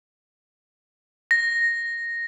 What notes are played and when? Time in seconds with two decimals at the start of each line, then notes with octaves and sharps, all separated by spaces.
1.31 A#6